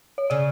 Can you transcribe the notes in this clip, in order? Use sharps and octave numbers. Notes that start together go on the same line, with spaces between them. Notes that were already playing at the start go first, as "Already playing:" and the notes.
C#5
C#3 D5